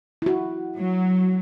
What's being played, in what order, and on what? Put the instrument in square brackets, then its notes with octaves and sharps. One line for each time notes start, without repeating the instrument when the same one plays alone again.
[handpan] E4 F#4
[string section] F#3